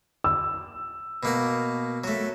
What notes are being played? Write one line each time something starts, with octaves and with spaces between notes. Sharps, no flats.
E6
B2 A#3 F#5
F#3 A3